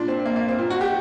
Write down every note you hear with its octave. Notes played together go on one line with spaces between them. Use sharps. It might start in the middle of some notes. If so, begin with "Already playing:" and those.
Already playing: A#2 D4
C4
A#3
A#3
C4
A#2
F#4
G4